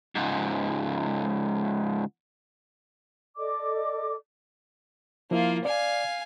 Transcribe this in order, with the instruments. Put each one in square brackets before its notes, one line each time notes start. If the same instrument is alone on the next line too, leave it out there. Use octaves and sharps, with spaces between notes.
[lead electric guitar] C#2 G#2
[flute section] A4 D5 D#5 D6
[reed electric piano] F3 E4 [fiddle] A#3 F4
[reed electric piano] D5 [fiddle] F5 G#5